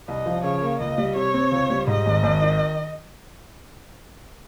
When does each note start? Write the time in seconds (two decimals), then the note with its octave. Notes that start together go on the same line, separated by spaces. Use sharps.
0.08 C2 D#5
0.26 F3
0.44 C#3 C#5
0.62 A#3
0.80 C#2 D#5
0.98 G3
1.16 C3 C#5
1.34 C4
1.51 C#2
1.70 G3
1.87 G#2 D#5
2.05 G#1
2.23 G#1
2.42 D#3